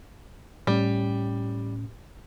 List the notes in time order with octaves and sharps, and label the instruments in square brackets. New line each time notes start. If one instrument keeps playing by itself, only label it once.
[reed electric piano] A2 C#4 [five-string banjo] G3